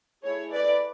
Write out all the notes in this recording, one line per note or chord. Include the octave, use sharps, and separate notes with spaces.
A3 E4 G#4 C#5
B4 D5